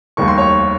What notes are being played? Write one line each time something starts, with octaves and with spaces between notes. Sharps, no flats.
F1 D#2 D#3 G3 A#3 C#6
C6
C#5 C#6